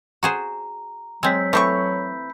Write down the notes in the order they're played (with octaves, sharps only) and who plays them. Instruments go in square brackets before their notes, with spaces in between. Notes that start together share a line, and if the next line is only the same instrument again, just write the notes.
[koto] F#4 G#4 C5 [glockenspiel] A#5
[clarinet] F#3 [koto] G#3 C4 [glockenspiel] E6 G6 B6
[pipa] E3 C4 C#6 [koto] A3 [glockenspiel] B5 G6